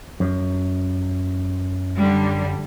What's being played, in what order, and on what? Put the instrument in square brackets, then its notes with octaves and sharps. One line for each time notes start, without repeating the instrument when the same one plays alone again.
[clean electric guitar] F#2
[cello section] D3 G3